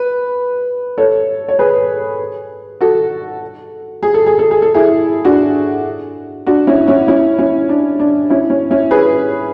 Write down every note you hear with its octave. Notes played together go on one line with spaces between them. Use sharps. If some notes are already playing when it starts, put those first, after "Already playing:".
Already playing: B4
A4 C#5
C#5
G#4 B4
F#4 A4
G#4
A4
G#4
A4
G#4
A4
E4 G#4
D4 F#4
D4 F#4
C#4 E4
C#4 E4
C#4 E4
C#4 E4
D4
D4
C#4 E4
C#4
C#4 E4
G#4 B4